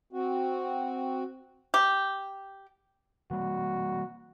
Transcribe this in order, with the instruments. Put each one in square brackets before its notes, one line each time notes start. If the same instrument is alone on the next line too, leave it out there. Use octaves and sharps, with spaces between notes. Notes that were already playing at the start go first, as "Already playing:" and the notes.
[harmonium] C4 F#4
[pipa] G4
[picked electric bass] E3 G3 A#3 [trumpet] F#4